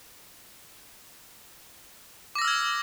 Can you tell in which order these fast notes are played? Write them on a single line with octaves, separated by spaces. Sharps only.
D6 A#6 E6 F6 G#6